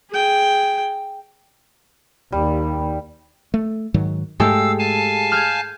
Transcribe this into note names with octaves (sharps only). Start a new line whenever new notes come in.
G#4 G5
D#2 G3
A3
G#2 D#3 F#3
G#2 G#3 A3 G4 A4 F5 E6
F5 G#5 A5
F6 G6 G#6